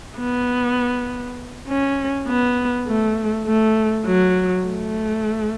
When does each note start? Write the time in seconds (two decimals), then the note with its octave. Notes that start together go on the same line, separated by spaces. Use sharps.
0.18 B3
1.67 C#4
2.27 B3
2.87 A3
3.46 A3
4.06 F#3
4.66 A3